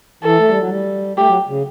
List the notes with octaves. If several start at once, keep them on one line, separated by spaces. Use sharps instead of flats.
E3 A4
A3
G3
F#3
G3
A3 G4
F#3
C#3